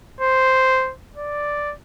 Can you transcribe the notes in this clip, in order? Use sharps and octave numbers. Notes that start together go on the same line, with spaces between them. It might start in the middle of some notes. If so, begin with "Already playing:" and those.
C5
D5